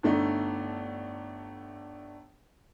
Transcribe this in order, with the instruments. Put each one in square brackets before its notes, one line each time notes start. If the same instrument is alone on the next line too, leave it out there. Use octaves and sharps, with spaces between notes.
[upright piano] G1 D3 A3 D#4